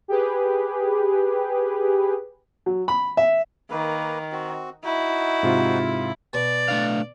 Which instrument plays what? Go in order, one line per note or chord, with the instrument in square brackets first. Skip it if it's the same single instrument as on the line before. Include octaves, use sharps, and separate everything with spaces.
[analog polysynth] G4 G#4 B4
[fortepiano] F#3
B5
E5
[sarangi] D#3 [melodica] A#3 B4
[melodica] C4 F#4
[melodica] D#4 F#4 [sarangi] E4
[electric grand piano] G#2 C3 F4
[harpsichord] B2 [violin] D5 [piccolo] A6
[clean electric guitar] A3 D4 F5